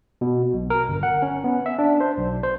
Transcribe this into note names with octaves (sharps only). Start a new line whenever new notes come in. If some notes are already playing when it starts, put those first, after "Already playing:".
B2
B1
A#4
G1
F#5
C#4
B3
E5
D4
C5
B1
C5